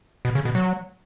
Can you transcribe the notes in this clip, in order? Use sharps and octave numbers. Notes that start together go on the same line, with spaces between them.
B2
C#3
B2
F#3